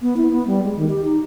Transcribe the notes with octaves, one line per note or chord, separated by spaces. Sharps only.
B3
E4
B3
G3
G#3
D#3
G4
D#4